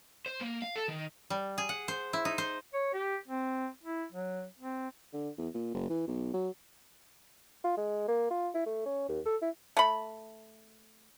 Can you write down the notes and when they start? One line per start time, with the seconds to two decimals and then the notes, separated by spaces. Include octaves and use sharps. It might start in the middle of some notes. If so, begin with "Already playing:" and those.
0.26 C5
0.41 A#3
0.62 F5
0.76 A4
0.88 D#3
1.30 G3
1.58 G#4
1.69 F#5
1.88 C5
2.13 E4
2.25 D#4
2.38 C5
2.74 C#5
2.94 G4
3.28 C4
3.84 E4
4.13 F#3
4.59 C4
5.13 D3
5.38 E2
5.54 A#2
5.74 F#1
5.89 E3
6.07 B1
6.34 F#3
7.64 F4
7.77 G#3
8.08 A#3
8.30 F4
8.54 E4
8.66 A3
8.85 C#4
9.08 D#2
9.25 A4
9.42 E4
9.77 A3 B5